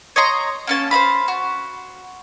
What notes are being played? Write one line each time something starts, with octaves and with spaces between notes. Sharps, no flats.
C#5 D#5 A#5 C6
A#3 C#4 A5
C5 D#5 F5 B5
F#4